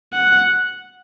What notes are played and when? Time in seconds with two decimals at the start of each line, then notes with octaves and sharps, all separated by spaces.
0.13 F#5